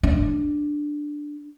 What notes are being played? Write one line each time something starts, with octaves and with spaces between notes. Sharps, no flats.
D4